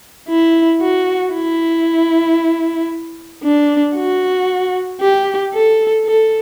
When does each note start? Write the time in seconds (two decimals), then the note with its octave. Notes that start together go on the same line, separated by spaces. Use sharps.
0.29 E4
0.81 F#4
1.34 E4
3.43 D4
3.96 F#4
5.01 G4
5.53 A4
6.06 A4